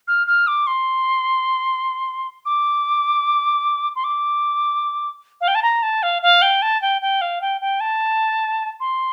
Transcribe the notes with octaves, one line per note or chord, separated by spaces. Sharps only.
F6
F6
D6
C6
D6
C6
D6
F5
G5
A5
A#5
A5
F5
F5
G5
A5
G5
G5
F5
G5
G5
A5
C6